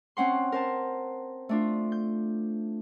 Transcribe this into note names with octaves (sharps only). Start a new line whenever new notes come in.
C4 C#4 F#5 C6
A#4 C5 A5
A3 D4 F4
G6